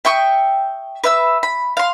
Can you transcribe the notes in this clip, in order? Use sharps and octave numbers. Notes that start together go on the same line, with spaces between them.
E5 G5 C#6 D#6
B4 E5 E6
B5
F5 C6